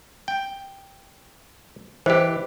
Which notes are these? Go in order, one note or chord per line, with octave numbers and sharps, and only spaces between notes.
G5
E3 G4 C5 D#5